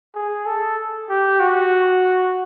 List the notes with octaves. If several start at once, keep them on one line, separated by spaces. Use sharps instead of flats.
G#4
A4
G4
F#4